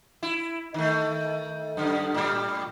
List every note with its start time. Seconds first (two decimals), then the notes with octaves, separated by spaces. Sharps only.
0.23 E4
0.74 D#3 A3
1.77 F#2 D3
2.14 A2 G3